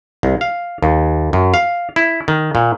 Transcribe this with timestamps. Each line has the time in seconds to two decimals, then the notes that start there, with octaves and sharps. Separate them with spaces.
0.23 C2
0.41 F5
0.83 D#2
1.33 F#2
1.54 F5
1.96 E4
2.28 D#3
2.55 A#2